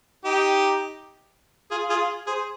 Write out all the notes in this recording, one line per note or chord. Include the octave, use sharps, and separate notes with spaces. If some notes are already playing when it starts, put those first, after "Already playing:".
D#4 G4
F4 G#4
F4 G#4
G#4 C5